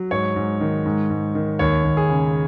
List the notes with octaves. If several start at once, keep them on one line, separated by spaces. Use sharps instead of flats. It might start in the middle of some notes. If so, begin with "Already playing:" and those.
Already playing: F#3
G#2 C#5
G#2
D#3
G#2
G#2
D#3
D#2 C#5
D#2
G#4
C#3